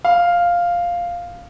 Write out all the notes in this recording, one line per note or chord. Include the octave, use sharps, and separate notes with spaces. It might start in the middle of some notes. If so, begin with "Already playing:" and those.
F5